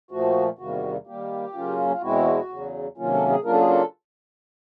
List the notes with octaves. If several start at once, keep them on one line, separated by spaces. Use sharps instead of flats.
A#2 F3 A3 F#4
E2 C3 D#3 G3 A#3 F#4
D#3 G3 A#3 G4
C#3 F#3 A#3 C#4 F4
F4
E2 B2 G#3 C4 E4 F#4
E2 C#3 F#3
C3 D#3 F#3 A#3 C#4 F4
A4
G#4
C#3 F#3 A#3 D4 F4 A#4
A4
G#4
A4